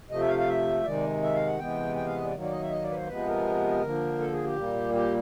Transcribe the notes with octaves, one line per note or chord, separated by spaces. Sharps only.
C3 F3 A3 D#5
E5
F5
F5
E5
C3 D#3 G#3 D5
E5
F5
F#5
C3 E3 G#3 B3 G5
G5
F5
D#5
D5
D#3 F#3 A#3
D5
D#5
E5
D#5
D5
B4
C5
C3 F3 G#3 B3 B4
A#4
D3 F3 A#3
A4
G#4
G4
A#2 G3 A#3
G4